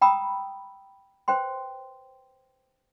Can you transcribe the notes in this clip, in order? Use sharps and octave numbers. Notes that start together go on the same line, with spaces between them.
G5 A#5 B5 D#6 E6
B4 C5 G5 C6